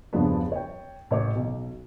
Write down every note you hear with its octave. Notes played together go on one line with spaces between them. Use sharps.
E2 G2 C#3 F3 B3 D4
C#5 G5
A1 C#5 D6
B1